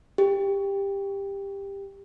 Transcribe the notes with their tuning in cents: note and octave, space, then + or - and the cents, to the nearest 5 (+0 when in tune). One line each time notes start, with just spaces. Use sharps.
G4 +15